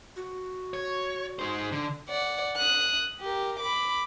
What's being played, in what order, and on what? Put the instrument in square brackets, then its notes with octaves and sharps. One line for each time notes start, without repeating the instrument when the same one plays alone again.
[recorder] F#4
[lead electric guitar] C#5
D#4 C5
D3
[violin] D5 F#5
D#6 F#6
G4 A#4
B5 D6